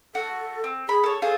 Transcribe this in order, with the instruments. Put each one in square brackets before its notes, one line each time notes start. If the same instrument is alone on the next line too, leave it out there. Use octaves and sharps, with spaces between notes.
[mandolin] F#4 [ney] A4
[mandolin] C4
[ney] G#4 [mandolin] B5
[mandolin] A4 C#5
[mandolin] F4 G#4 C5 [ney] A4